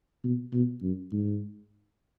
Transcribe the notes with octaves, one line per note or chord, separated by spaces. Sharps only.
B2
B2
F#2
G#2